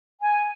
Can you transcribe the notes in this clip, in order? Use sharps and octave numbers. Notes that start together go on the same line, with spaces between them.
G#5